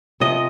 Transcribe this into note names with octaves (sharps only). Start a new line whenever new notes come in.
C3 F3 D#5